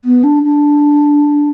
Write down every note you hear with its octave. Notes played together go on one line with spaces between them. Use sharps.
B3
D4
D4